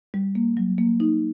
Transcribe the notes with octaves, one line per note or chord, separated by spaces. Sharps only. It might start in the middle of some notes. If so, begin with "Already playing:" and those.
G3
A#3
F#3
A#3
D#4